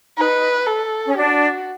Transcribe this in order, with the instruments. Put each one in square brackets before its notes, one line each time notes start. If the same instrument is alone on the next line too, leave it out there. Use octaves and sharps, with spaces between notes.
[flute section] D#4 [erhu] B4
[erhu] A4
[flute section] C#4
[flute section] D4 [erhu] F#4